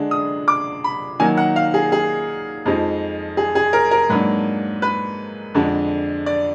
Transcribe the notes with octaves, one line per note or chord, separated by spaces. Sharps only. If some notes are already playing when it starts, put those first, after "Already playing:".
Already playing: D3 G#3 D4
D#6
D6
B5
D#3 F#3 A#3 D#4 G#5
F#5
F5
G#4
G#4
F2 F3 G#3 D#4
G#4
G#4
A#4
A#4
G#2 F#3 A#3 D4 B4
B4
F2 D3 G#3 D4
D5